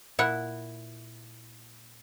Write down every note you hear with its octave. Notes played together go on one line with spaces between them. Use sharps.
A#2 E4 F#5